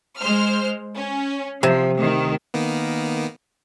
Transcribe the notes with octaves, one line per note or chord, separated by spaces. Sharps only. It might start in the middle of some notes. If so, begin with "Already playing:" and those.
G#3 C5 F6
C#4
C3 F3
D2 D#3
D#3 A#3 B3